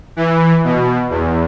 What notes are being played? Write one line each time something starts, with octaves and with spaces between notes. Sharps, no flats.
E3
B2
E2